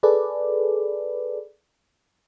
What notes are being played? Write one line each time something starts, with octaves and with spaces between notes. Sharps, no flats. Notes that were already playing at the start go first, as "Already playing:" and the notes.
G#4 A4 B4 D5